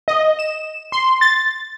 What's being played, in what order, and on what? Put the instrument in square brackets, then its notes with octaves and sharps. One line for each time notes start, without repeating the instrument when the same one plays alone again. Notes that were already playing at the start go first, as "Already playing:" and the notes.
[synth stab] D#5
E7
C6
A6